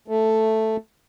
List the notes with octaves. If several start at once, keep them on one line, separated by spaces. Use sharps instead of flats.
A3